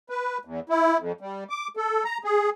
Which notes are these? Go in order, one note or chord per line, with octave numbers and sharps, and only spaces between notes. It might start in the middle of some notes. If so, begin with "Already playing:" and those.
B4
E2
E4
F2
G3
D6
A4
A#5
G#4